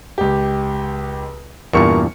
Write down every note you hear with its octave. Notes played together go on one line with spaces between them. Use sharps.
C#2 G4
E2 G2 A#2 A#3 C#6 C#7